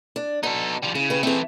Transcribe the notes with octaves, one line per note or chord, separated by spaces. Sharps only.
D4
B2 D#4 A4
F3 G3
C#3 E4
G4 B4
E3 A3 C4 G#4